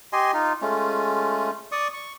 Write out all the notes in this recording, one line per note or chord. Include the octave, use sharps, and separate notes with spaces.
G4 D#5 G#5 C6
D#4 F4
G#3 A3 C#4 F4
D5 C#6 D#6
C#6